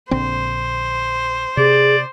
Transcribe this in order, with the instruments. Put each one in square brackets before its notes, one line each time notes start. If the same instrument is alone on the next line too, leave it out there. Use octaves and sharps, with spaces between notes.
[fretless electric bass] A#1 D3 C4 [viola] C5
[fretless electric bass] C3 [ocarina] G#4 [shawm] D5